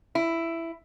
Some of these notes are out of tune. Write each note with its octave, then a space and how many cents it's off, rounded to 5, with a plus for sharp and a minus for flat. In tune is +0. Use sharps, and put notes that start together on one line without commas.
E4 +10